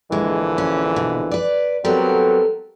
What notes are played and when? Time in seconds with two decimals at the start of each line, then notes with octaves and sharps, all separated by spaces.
0.12 A#1 D3 E3 G#3
0.58 C#4
0.96 B2
1.31 B4 D5
1.85 F#3 G3 B3 C4 A4 A#4